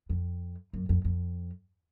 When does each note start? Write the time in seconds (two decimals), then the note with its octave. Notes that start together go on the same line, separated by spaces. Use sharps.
0.09 F2
0.73 F#2
0.89 F2
1.05 F2